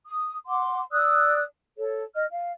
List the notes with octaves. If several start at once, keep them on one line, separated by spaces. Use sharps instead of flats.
D#6
F#5 C6 D6
D5 D#6 E6 F#6
A4 C#5
D#5 F6
F5